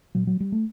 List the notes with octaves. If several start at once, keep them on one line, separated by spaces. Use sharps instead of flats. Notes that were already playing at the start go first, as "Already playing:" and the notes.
A#2 F#3
F#3
G3
A3